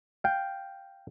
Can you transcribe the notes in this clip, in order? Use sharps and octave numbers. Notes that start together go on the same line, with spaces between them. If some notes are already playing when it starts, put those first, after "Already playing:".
F5 G5